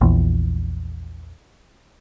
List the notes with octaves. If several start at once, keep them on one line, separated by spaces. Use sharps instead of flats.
A#1 E2